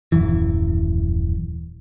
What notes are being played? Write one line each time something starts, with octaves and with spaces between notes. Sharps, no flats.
D#1 F#2 E3